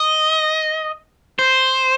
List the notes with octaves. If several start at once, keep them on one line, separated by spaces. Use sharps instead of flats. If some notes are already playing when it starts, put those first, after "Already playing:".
Already playing: D#5
C5